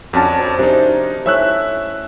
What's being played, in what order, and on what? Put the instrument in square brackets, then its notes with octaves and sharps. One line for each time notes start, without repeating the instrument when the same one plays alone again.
[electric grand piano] F2 C#4 A5 [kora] D4 F#4 A#4
[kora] C4
[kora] C3 A#4 F#5 [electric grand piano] D4 D#4
[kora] A3 C#4 E4 [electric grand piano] E5 E6 F#6